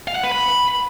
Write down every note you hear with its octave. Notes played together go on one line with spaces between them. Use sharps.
F5
F#5
B4
B5